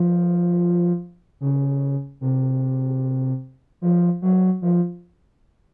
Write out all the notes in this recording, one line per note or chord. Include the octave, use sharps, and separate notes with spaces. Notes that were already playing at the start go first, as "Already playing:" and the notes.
Already playing: F3
C#3
C3
F3
F#3
F3